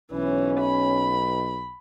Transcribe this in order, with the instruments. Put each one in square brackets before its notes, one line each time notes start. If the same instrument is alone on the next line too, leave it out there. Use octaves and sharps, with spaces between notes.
[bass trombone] B1 [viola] E3 [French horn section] C#4
[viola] B5